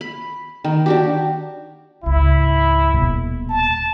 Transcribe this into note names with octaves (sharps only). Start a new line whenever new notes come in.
B5
D#3
D4 F#4 G4
C#2 G#2 E4
D#1 B2
A5